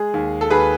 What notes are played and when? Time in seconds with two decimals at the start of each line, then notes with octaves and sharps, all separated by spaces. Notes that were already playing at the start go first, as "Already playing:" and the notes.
Already playing: G#3 G#4
0.14 D#2
0.41 A4
0.50 D#2 G#4 B4